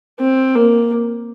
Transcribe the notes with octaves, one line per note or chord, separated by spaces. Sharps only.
C4
A#3